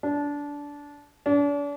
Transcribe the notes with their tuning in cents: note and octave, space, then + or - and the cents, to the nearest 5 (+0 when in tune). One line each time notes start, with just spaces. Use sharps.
D4 -20
D4 -40